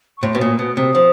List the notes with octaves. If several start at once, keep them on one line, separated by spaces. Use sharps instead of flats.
C#6
A2 C6
B2
A#2 D#6
B2 D#6
C3 D#6
F3